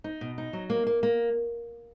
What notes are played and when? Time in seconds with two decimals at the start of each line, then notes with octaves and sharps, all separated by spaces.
0.04 D#4
0.21 B2
0.38 D#4
0.53 F#3
0.70 A#3
0.87 A#3
1.03 A#3